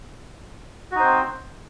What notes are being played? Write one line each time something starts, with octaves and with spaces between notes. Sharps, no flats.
C4 D#4 F#4 C5